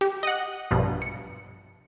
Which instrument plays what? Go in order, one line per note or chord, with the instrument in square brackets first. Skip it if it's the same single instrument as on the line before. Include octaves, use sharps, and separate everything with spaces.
[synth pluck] G4
D#5 F#5
A#1 G2 B2
C#7